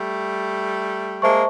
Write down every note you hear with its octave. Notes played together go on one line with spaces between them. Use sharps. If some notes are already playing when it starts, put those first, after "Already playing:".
Already playing: G3 A3
G#3 A#3 C5 E5 A5 C#6